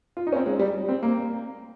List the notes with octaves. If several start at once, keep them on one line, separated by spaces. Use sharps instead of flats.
F4
D#4
C#4
C4
G#3
G3
C4
A#3